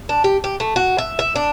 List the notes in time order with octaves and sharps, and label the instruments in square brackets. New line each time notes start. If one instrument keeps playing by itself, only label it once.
[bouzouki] D4
G4
G4
A3
F#4
E5
E5
D4